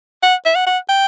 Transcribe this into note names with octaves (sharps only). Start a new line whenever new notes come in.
F#5
E5
F#5
F#5
G5